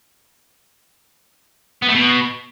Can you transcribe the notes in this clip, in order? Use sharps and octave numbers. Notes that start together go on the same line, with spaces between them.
B3
A3
B2